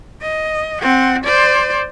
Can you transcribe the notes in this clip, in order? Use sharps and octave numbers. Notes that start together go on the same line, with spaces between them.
D#5
C4 F#5
C5 D5